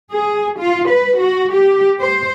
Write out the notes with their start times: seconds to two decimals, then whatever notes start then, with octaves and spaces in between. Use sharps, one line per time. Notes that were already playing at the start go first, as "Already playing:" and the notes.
0.11 G#4
0.58 F4
0.88 B4
1.18 F#4
1.52 G4
2.00 C5